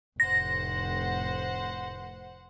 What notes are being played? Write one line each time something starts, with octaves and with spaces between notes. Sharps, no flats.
F1 A2 C5 F#5 A#6